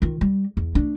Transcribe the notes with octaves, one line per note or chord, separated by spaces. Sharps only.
D#3 F4
G3
E2
A3 D4